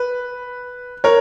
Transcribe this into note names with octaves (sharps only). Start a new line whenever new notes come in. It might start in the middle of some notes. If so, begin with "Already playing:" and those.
Already playing: B4
A#4 C#5